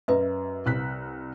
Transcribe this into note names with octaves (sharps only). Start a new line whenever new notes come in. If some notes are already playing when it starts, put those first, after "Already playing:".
F#2 B4 D#5 E5
C2 F#6 B6